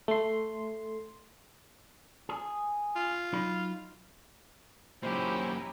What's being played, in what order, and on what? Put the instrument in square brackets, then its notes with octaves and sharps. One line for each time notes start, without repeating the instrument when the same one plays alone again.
[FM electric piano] A3 C6
[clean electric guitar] G#4
[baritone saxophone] F4
[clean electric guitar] F#3 D#4 B5
[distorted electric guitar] F#2 A#2 [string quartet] C#4 D#4 E4 [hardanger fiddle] G4 [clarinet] C5